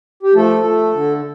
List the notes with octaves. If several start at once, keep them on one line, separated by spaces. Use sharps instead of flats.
G4
F3 A3 A4
A3
D3